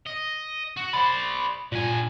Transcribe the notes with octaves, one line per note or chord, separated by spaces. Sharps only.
D#5
F#4
C5 D5 B5
G2 A#2 G#5